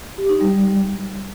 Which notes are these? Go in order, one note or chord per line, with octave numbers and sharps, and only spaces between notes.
G4
D#4
G3